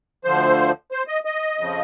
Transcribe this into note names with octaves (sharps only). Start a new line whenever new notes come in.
D2 D3 F3 C5
C5
D#5
D#5
F2 C#3 F3